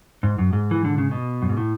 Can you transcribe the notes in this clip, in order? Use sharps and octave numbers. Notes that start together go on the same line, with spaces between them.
G#2
F#2
G#2
E3
D3
C#3
B2
F#2
G#2
A2